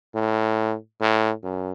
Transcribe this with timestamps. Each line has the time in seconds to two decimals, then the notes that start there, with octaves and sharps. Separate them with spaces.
0.15 A2
1.01 A2
1.44 F#2